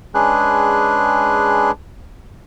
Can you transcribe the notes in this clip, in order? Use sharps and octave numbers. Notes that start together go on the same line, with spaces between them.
G#3 C#4 D4 G#4 B4 F#6